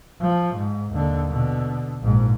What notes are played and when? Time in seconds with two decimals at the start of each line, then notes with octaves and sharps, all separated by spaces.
0.21 F3
0.56 G#2
0.93 D#2 D3
1.29 B2 D3
2.01 A#1 G#2